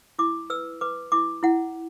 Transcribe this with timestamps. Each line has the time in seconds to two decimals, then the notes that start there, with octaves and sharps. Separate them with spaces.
0.19 E4 D6
0.50 B4 E6
0.81 B4 D6
1.12 E4 D6
1.43 E4 F#5